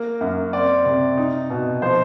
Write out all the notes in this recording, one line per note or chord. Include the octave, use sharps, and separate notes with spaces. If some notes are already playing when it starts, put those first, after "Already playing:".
Already playing: A#3
F#2
C4 D5
C3
D#4
B2
F3 C5